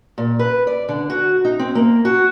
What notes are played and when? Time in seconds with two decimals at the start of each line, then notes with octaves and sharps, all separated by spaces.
0.18 A#2
0.39 B4
0.67 D5
0.89 D3
1.10 F#4
1.45 D#4
1.59 C4
1.75 A#3
2.05 F#4